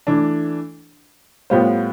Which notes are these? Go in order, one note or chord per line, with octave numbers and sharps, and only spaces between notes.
E3 A3 D4
A2 G3 B3 F4 C5